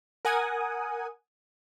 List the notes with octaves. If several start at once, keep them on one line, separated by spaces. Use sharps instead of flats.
A#4 F#5 G#5 D#6